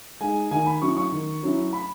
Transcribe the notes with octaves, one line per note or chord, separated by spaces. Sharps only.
G#3 D#4 G#5
D#3 G#5
B5
F#3 C#4 E4 C#6
C#6
D#3
F#3 C#4 E4
B5